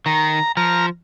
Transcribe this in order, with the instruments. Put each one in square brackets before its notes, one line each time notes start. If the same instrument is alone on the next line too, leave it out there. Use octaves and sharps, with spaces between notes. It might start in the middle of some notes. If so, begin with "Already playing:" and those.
[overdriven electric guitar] D#3 [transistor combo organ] A#5
[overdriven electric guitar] F3 [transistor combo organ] A#5 F6